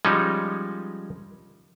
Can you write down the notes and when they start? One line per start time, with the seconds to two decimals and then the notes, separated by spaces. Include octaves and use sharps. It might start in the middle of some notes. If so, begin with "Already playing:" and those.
0.05 F3 G3 G#3 C#4 D#4